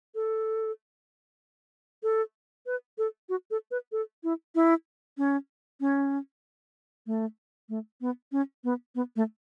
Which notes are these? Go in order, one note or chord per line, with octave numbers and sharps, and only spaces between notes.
A4
A4
B4
A4
F#4
A4
B4
A4
E4
E4
C#4
C#4
A3
A3
B3
C#4
B3
B3
A3